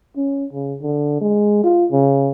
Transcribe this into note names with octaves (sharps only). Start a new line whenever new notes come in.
C#4
C#3
D3
G#3
F4
C#3